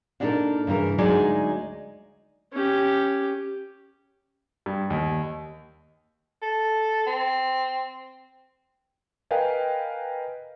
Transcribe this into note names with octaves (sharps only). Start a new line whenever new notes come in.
A#2 D4 D#4 G4 A4 A#4
G2 C#3 E3 A#4
D2 F#3 G#3 D#4 D5 G#5
C#4 G4
G2
D#2
A4
C4
A#4 B4 D#5 F5 G5 G#5